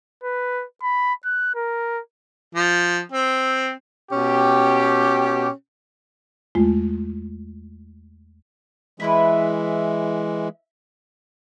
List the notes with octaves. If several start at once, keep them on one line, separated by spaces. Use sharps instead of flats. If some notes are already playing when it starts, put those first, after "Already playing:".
B4
B5
F#6
A#4
F3
C4
B2 C#4 G4
E2 G#3 A3 F4
E3 G#3 E4 B4 E5